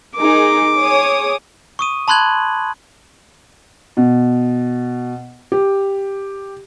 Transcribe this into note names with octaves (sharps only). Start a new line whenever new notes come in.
D#4 G#4 A#4 D6
G#4 C#5 D#6
C#6 D#6 D#7
A5 B5 C6 F#6 G#6 F#7
B2
G4